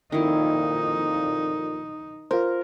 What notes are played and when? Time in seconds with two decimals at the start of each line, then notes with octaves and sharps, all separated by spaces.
0.12 F2 A#2 D#3 D#4 E4
2.31 F4 A#4 C5